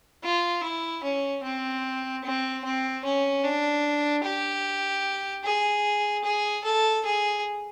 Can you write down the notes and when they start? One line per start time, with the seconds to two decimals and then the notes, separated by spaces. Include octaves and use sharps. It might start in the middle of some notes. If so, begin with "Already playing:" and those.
0.23 F4
0.63 E4
1.03 C#4
1.44 C4
2.24 C4
2.64 C4
3.04 C#4
3.44 D4
4.24 G4
5.44 G#4
6.24 G#4
6.64 A4
7.05 G#4